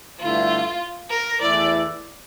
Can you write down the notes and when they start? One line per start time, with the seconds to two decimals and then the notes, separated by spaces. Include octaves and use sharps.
0.20 G2 D3 A3 E4 F4
1.10 A#4
1.41 E2 E3 A3 E4 D5